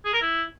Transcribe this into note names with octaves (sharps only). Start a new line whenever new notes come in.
G#4
A#4
E4